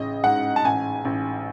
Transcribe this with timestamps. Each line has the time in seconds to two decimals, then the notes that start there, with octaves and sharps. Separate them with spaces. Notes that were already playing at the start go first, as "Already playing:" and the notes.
Already playing: A1 C#3 D#5
0.24 G#2 F#5
0.56 A5
0.65 A1 G#5
1.05 A1